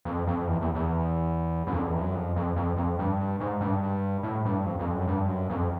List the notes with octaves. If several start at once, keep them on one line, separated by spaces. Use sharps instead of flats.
F2
F2
E2
E2
E2
F#2
F2
E2
F#2
F2
F2
F2
F2
G2
G#2
G2
A2
G2
F2
F2
F#2
G2
F#2
F2